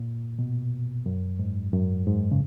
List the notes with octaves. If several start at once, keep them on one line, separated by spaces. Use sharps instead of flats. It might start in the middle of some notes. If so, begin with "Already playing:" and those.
Already playing: A#2
B2
F#2
G#2
F#2
G#2
C#3